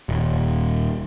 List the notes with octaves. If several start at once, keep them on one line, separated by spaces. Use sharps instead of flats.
D#1